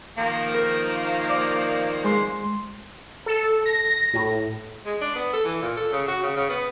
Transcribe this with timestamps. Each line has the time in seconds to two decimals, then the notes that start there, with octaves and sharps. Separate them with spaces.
0.17 D#3 F3 A#3
0.54 A#4
1.29 D5
2.04 G#3 C5
3.26 A4
3.66 A#6
4.13 A2
4.85 G#3
5.01 D4
5.15 B3
5.33 A4
5.45 E3
5.62 A#2
5.77 A4
5.92 C#3
6.08 F#4
6.23 C#3
6.36 C#3
6.49 B3